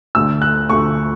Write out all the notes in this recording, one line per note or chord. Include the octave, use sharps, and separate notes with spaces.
D2 D3 A3 E6
F#6
D2 D3 A3 C#6